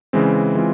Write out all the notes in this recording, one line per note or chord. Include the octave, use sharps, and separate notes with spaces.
C#3 E3 G#3 C4
E3 G#3 C4 F4